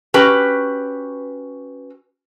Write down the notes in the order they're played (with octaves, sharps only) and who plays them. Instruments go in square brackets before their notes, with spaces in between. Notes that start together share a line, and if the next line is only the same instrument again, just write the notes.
[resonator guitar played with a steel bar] C#4 F#4 G4 B4